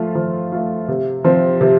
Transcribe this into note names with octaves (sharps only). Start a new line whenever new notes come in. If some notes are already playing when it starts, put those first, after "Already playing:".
Already playing: F3 A3 F4
F3
A3 F4
C3
F3 C4
C3